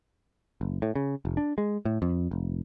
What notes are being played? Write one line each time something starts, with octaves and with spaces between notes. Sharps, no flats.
F#1
A2
C#3
F1
D4
G#3
A2
F2
F1